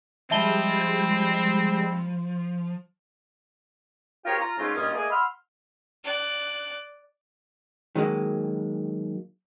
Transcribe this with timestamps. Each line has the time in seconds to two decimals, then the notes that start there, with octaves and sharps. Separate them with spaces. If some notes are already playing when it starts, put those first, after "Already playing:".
0.31 F3 G3 G#3 C4 E5 A5 B5 G7
4.25 C4 F4 G4 G#4 A#4 C#5
4.39 F4 A#5
4.58 G#2 C#3 A3 A#3 C#4 F4
4.74 G2 A#2 C#3 C#4 F4 D#5
4.93 A3 A#3 G#4 D5 D#5
5.10 F#5 B5 C6 E6 F6
6.04 D5 F#6
7.95 D#3 F#3 G#3 A#3